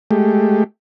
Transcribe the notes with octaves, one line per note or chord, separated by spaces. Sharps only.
G#3 A3 G4